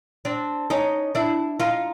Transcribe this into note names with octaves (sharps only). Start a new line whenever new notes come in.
C4 D4
C#4 D#4
D4 E4
D#4 F4